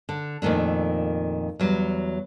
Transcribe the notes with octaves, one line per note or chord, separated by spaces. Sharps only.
D3
F2 A#2 D#3 A3 D4
E2 F#3 G3